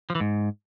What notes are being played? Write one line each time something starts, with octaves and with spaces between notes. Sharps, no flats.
F3
E3
G#2